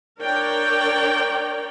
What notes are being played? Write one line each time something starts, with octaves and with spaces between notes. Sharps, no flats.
D4 A#4 C#5 D5 G5